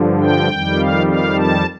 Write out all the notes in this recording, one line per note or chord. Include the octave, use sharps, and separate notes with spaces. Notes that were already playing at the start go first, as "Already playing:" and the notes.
Already playing: G2 D3 F3
G5
F2 D#3 G3
F5
F5
A5